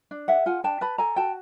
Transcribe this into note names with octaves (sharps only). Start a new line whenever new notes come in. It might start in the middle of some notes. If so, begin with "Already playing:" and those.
D4
G#4 E5 F#5
F4 F#5 G#5
D4 G5 A5
B4 A5 B5
A4 G#5 A#5
F#4 G5 A5